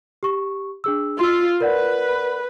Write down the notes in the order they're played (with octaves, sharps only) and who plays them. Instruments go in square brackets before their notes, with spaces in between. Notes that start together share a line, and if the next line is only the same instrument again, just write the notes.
[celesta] G4 C#6
D4 G#4 E6
[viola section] F4 [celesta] C6 E6
[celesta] A#4 D5 F#5 [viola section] B4